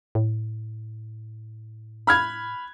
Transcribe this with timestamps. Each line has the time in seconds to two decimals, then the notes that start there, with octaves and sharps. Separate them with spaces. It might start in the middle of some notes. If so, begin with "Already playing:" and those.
0.15 A2
2.07 B5 F6 G#6